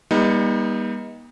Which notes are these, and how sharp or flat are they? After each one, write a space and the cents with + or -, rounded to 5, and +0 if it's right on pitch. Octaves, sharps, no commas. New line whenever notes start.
G3 +35 B3 -40 D#4 +20